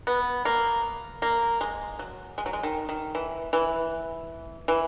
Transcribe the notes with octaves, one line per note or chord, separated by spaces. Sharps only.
B3
A#3
A#3
G#3
F#3
G#3
F#3
G#3
D#3
D#3
E3
E3
E3